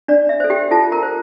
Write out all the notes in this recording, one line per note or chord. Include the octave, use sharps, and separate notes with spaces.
D4 D5
E5
A4 C5
G4 G5
F4 A4 A5
A#4 A#5
C5